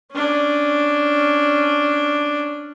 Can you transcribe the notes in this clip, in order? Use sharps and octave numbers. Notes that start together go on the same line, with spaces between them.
C#4 D4